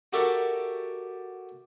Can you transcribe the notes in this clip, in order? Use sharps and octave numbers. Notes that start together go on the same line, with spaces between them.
F#4 G4 A4 A#4 D5 E5